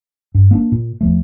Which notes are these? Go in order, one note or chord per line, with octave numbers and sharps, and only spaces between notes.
G2
A#3 B3 D4
A#2
E2 F3 A3